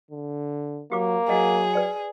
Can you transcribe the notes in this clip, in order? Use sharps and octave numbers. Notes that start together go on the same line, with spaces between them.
D3
F#3 A#3 G4 F5 D6
F#3 G#4 D#5 F#5
B4 D5 G5